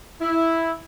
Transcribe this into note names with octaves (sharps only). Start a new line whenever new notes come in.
E4